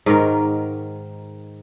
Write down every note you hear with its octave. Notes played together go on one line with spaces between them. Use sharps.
G#2 D#3 A#4